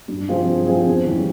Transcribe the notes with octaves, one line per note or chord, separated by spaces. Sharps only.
G2
F3 C4 F4 G#4
G2
F3 C4 F4 G#4
E2
E3 G3 C#4